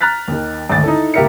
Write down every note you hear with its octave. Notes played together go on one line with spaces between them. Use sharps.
A#5 F6 F#6 A6 B6
D#2 D#3
G#1 D2 A6
D#4 E4 A4
C#2 A#3 G4 A#4 E5 C#7